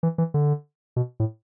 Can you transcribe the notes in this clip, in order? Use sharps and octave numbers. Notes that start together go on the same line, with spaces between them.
E3
E3
D3
B2
A2